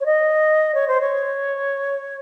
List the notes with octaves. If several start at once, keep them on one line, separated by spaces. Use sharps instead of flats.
C#5
D#5
C#5
C5
C#5